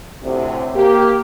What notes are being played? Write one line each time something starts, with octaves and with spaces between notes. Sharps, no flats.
D2 A2 C3
A#3 G4